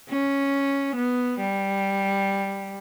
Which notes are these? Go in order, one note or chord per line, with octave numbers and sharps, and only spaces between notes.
C#4
B3
G3